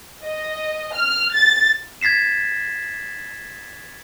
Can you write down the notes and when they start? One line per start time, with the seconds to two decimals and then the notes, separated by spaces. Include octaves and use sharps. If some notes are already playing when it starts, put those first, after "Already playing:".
0.24 D#5
0.94 F6
1.35 A6
2.01 G#6 A6 B6 C7 E7